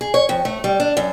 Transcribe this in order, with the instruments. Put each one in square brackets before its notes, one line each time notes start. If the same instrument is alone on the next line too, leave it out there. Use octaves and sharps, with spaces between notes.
[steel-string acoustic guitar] G#4
C#5
F2
A3
G3
D4
F#2